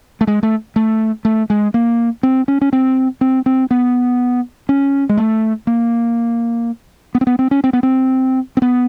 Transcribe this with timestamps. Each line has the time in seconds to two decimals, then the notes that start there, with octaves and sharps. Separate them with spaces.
0.21 A3
0.27 G#3
0.43 A3
0.76 A3
1.25 A3
1.50 G#3
1.74 A#3
2.23 C4
2.48 C#4
2.61 C#4
2.73 C4
3.21 C4
3.46 C4
3.71 B3
4.69 C#4
5.09 G#3
5.17 A3
5.67 A#3
7.15 B3
7.21 C4
7.27 B3
7.39 C4
7.51 C#4
7.64 C4
7.73 B3
7.83 C4
8.57 C4
8.62 B3